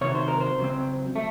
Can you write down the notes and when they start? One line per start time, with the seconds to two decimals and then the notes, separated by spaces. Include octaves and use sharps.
0.01 C3 D#3 F#3 C#5
0.15 C5
0.28 A#4
0.40 C5
0.59 C#3 F#3 C4
1.16 A3